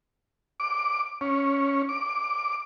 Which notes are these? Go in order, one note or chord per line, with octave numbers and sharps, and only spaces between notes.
D6
C#4
D6